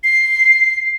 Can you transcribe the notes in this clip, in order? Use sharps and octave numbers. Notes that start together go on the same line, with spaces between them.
C7